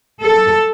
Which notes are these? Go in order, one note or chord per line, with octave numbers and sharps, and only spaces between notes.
A4